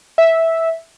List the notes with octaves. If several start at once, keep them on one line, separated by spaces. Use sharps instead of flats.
E5